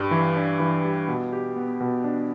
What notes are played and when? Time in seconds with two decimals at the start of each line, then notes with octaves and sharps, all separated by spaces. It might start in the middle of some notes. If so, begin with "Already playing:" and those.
Already playing: G2 G3
0.11 E3
0.36 D4
0.60 E3
0.84 G3
1.08 B2
1.32 G4
1.56 B3
1.80 B2
2.04 D4